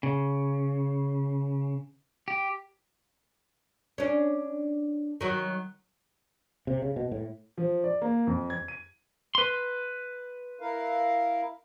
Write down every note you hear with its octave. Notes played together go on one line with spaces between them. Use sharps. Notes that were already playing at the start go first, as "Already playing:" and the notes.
C#3
G4
C#4 D4
D#3 F#3
C3
C#3
B2
A2
F3
D5
A#3
F2
G#6
D#7
B4 C6
E4 A#4 F5